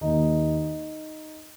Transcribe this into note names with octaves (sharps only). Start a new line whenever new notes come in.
D#2 D#3 D#4